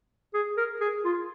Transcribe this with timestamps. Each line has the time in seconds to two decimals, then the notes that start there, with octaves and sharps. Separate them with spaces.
0.34 G#4
0.58 A#4
0.81 G#4
1.05 F4